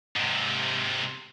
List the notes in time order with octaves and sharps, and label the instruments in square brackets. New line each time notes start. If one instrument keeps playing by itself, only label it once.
[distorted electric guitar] G#2 C3